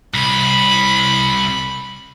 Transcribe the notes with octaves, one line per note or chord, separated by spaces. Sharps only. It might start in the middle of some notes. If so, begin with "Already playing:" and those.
C2 B5